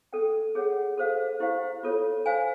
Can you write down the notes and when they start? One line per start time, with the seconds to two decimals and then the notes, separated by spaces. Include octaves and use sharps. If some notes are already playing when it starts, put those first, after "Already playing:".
0.13 A4 D5 G5
0.55 G#4 C#5 F#5
0.97 F#4 A4 C5 F5
1.40 E4 G4 C5 F5
1.83 F4 A4 C#5
2.26 C5 F5 G#5